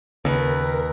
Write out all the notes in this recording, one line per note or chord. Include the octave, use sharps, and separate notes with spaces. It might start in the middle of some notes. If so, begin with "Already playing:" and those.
D#2 C#3 A#4 B4